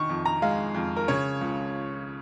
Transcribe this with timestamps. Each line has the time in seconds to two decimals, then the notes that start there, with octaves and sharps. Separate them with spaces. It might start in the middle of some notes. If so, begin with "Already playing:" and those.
Already playing: D#3 C#6
0.09 F2
0.25 A#5
0.42 G#3 F5
0.75 F2
0.96 A#4
1.08 C#3 C#5
1.41 C#2